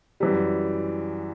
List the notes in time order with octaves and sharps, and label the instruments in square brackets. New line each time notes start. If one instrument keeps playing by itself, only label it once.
[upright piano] F#2 E3 G3